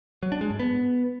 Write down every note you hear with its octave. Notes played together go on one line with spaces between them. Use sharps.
F#3
D4
G#3
G#2
B3